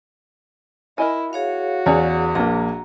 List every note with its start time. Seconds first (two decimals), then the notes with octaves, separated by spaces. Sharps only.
0.98 E4 A#4 D#5 G#5
1.33 F#4 G#4 C#5 F5
1.86 E2 B3 C#4 D5
2.35 A#1 A#3 A#5